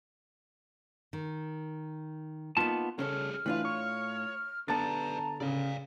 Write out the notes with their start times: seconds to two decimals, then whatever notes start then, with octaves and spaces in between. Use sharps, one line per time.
1.13 D#3
2.57 A#3 B3 D#4 F4 A5
2.99 C#3 G3 C#4 G#4 A4 F6
3.46 A2 E3 D4 F4 B4
3.65 C#5 C#6
4.68 D3 B3 B4 D5 A5 A#5 A6
5.40 C#3 G#4 D5 F5